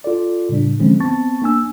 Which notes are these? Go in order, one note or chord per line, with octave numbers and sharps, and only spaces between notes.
F4 A4 D5
A2 C#3 G3 D4
D3 E3 F3 G#3 C4 C#4
B3 C4 A5 C#6 A6
A#3 D4 G#5 E6